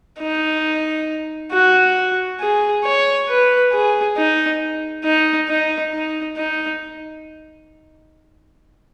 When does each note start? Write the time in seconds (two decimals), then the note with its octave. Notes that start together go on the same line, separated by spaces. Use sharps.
0.20 D#4
1.52 F#4
2.41 G#4
2.84 C#5
3.29 B4
3.72 G#4
4.17 D#4
5.05 D#4
5.49 D#4
5.93 D#4
6.37 D#4